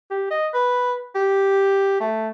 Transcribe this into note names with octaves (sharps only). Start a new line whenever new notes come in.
G4
D#5
B4
G4
A3